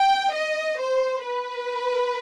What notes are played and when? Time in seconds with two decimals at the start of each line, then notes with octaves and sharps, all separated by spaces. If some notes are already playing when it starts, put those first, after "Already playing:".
Already playing: G5
0.33 D#5
0.80 C5
1.25 B4